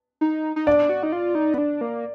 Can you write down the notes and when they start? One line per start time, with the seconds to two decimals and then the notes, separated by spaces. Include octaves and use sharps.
0.21 D#4
0.56 D#4
0.66 D4 D5
0.89 F#4
1.03 D#4
1.12 F4
1.35 D#4
1.54 B3
1.58 D4
1.81 A#3